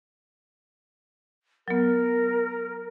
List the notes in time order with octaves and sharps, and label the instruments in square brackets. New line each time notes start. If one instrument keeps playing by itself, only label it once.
[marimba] F#3 B3 [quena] A#4